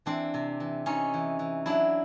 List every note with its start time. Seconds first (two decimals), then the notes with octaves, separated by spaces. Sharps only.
0.06 E3 C4 D4
0.34 C3
0.60 E3
0.86 C3 C#4 D#4
1.14 E3
1.39 E3
1.66 F#3 D4 E4